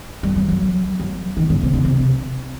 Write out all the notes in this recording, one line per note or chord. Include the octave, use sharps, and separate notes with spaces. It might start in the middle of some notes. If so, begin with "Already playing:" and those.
G3
F#3
F#3
F#3
D#3
D3
C3
D3
C3